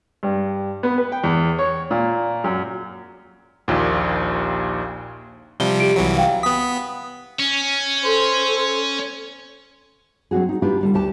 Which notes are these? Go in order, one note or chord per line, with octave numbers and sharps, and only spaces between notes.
G2
B3
B4
G5
E2
C#5
A#2
F#2
A#1 D#2 A#2
C3 F3 G3 G7
G4 D7
C2 E3 F#3
F5 G5
B3 D#6 B6
C#4
A4 C5
F#3 C4 D4 F#4 G#4
D#4
D4 D#4 F4 G4 B4
D3 G3 D4
D2 G4 A5